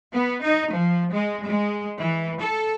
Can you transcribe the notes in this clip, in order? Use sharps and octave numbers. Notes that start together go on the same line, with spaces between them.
B3
D#4
F3
G#3
G#3
E3
A4